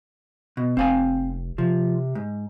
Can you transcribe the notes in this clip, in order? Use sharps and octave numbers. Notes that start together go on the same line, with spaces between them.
B2
F1 C4 F5 G#5
C3 F3
G#2